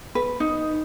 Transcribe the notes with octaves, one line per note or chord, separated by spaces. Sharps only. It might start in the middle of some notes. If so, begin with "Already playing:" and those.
B4
D#4